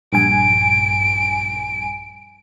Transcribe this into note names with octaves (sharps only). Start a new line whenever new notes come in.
A#1 G2 G#5 D7